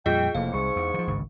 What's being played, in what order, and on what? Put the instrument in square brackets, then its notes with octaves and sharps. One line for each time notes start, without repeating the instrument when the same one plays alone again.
[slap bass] F2 A#2 G3 [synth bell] F4 G#4 D#5 [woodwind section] G5
[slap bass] F1 [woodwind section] F2 A2 A#3 [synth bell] F5
[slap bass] C2 [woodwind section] G#2 C#6
[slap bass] E2
E3 F3
G#1 C#2 G2